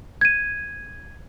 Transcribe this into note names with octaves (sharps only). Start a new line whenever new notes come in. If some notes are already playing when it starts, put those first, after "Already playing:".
G#6 D#7